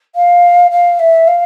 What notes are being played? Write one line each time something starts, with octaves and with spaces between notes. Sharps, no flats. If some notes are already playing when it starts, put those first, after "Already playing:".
F5
F5
E5
F5